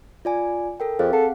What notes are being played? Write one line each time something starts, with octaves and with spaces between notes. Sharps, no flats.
F4 D5 G#5
A4 A#4 G5
F2 C4 G#4 F5
A4 F#5